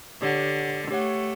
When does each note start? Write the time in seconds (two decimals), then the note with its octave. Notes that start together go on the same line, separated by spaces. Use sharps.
0.22 D3 G4 C#5 F#5
0.91 A3 G4 C#5 F#5